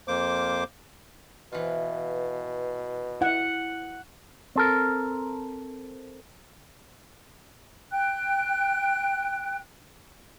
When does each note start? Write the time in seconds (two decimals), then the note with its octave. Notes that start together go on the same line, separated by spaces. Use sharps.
0.08 F2 A#3 C5 D6
1.52 B2 E3 F4
3.22 E4 E5 F#5
4.56 C4 A4 A#4
7.91 G5 F#6